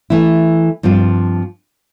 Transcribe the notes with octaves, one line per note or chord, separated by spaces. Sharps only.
E3 A3 E4
G2 F3 C4 F4